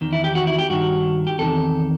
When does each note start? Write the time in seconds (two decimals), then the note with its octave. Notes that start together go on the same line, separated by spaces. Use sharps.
0.01 E2 D#3
0.13 E4
0.24 G4
0.35 F#4
0.47 E4
0.58 G4
0.70 G2 D#3 F#4
1.27 G4
1.38 E2 C3 D#3 A4